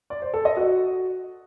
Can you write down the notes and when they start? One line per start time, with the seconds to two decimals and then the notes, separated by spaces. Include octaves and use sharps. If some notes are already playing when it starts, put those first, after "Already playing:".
0.10 D5
0.22 C5
0.34 A4
0.45 D#5
0.57 F#4